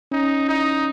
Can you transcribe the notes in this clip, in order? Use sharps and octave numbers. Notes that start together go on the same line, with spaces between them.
C#4 D#4
D#4 E4